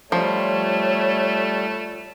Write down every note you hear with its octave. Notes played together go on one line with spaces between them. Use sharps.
F3 G3 A3 C#5